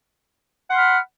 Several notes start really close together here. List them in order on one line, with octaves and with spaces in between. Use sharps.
F#5 C6 F6 B5